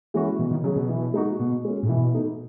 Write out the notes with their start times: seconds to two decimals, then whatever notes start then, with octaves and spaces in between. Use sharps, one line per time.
0.14 E3 G#3 C#4 F#4
0.38 B2 E3
0.51 D#3
0.64 C#3 F#3 C#4 G#4
0.76 B2
0.89 E3
1.14 G#3 D#4 F#4
1.39 B2
1.65 G#3 C#4
1.83 A2
1.89 B2 E3
2.14 A3 D#4